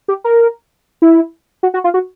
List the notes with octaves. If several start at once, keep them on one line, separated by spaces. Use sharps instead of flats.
G4
A#4
E4
F#4
F#4
F4
F#4